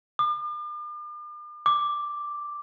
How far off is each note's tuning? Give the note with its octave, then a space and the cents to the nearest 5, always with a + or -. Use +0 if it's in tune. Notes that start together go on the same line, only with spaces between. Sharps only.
D6 +45
D6 +0